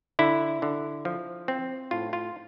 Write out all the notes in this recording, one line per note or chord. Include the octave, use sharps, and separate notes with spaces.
D3 E4
D3
F3
C4
A2 F4
F4